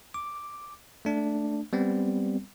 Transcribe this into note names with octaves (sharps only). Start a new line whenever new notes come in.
D6
A3 D4
G3 B3 C4